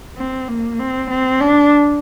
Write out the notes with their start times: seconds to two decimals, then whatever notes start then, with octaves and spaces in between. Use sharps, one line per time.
0.18 C4
0.48 A#3
0.79 C4
1.10 C4
1.40 D4